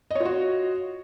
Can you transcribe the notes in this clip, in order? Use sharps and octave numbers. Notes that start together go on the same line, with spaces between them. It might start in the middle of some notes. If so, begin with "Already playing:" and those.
F4 F#4 C#5 D#5